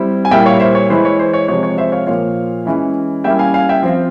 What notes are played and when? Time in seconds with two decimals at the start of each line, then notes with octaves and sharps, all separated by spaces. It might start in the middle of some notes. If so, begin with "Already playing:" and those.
Already playing: G3 C4 E4
0.25 G#5
0.31 A#2 G3 A#3 E4 E5 G5
0.46 C#5 F5
0.60 C5 E5
0.75 C#5
0.90 E3 G#3 E4 C5
1.05 C#5
1.19 C5
1.33 C#5
1.48 C3 F3 G#3 C#5
1.63 C#5
1.78 C5 E5
1.92 C#5 F5
2.07 A#2 F3 A#3 F4 C#5 F5
2.65 E3 G#3 C#4 E4
3.24 G3 A#3 C#4 E4 E5 G5
3.39 F5 G#5
3.54 F5 G#5
3.69 E5 G5
3.83 F3 C4 F4